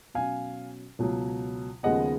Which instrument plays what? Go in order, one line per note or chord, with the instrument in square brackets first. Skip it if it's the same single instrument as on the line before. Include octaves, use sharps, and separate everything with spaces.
[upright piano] B2 F#3 C#4 F5 G#5
C#2 B2 F#3
D#2 C#3 F3 G#3 B3 D#5 F#5